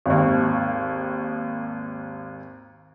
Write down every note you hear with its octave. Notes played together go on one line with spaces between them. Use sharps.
G#1 D#2